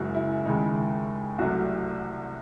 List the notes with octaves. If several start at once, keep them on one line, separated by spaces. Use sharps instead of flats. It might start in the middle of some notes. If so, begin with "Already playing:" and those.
Already playing: F#1 F#2 C#3 G#3 E4 F#4
E4
D#2 C#3 G#3 D#4
C2 C3 F#3 A3 F#4